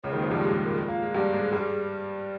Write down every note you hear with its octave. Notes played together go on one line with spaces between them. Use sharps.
C#2 C#3 C#5
D#2 D#3 A#4
F2 F3 C5
G2 G3
G#2 G#3 G4
G#4
A#4
F4
A#3
G#3
G2 G3 G4
G#2 G#3 G#4
G2 G3